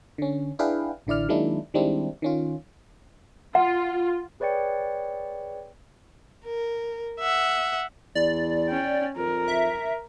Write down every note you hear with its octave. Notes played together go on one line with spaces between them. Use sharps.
D3 C#4
D4 E4 G#4 B4 F5 G5
A1 D3 E4 D5 F6
D#3 F#3 G#3 A#3 D4 E4
D#3 G3 G#3 C4 D4 E4
D#3 C#4 F4
F4 F#5
G#4 B4 C#5 D5 G5 C#7
A#4
E5 F#5
E2 D5
C#4 G5
F2 A#4
E5